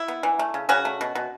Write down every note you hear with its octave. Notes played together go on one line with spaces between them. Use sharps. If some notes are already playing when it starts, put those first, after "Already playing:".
Already playing: E4
B3
E3
A3
C#3
C#3 C#4 F#4
A3
B2
B2